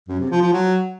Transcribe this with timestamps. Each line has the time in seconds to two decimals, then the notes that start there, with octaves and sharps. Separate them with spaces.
0.08 F#2
0.19 C3
0.30 F3
0.41 F3
0.52 F#3